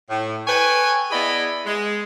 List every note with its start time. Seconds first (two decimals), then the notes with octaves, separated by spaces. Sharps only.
0.10 A2
0.47 A4 B4 C#5 G5 G#5
1.11 B3 E4 G#4 D5 D#5 B5
1.66 G#3